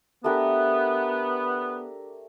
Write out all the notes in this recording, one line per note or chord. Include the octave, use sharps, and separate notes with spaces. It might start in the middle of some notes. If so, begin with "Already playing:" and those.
A3 B3 D4 G4 A#4